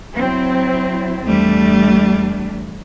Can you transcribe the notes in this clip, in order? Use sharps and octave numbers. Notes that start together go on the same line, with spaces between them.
F#3 C4 E4
E2 G3 A3 D4